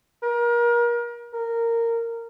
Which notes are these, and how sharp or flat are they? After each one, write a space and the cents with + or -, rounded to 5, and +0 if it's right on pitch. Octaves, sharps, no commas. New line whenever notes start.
A#4 +30
A#4 -15